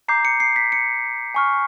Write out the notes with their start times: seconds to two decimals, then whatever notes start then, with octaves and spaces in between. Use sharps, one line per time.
0.08 A#5 D6 G6 C7
0.25 C#7
0.40 C7
0.56 B6
0.72 C#7
1.35 G#5 C#6 F6